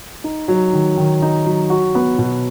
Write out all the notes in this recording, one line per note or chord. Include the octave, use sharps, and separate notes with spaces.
D#4
F#3
D#3
D#3
D#4
F#3
F#4
B3
B2